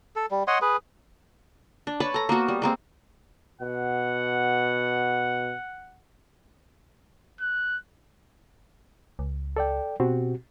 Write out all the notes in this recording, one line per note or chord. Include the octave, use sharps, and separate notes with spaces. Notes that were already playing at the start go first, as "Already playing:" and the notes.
A4
G3
C#5 D#5 F#5 C6
G#4 B4
D4
B4 C#5 A5 B5
A4 A#5
A#3 B3 F#4
G3
G#3 A#3 C4
B2 F#5
F#6
C#2
A4 D5 G5
B2 C4 F#4 G4